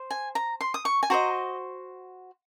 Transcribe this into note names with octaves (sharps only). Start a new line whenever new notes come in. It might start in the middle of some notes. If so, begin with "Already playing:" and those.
Already playing: C5
G#5
A#5
C6
D#6
C#6
G#5
F#4 C5 D#5 A#5